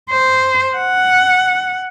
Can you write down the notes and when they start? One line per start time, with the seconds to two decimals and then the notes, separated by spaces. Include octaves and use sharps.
0.11 C5
0.76 F#5